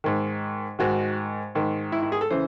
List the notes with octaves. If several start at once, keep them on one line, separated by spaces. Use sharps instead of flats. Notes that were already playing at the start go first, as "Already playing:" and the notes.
G#2 D#3
G#2 D#3 F#4
G#2 D#3
E4
E4
G#4
A4
C#3 E3 C5